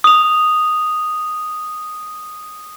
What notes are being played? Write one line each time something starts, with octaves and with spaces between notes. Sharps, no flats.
D#6 F7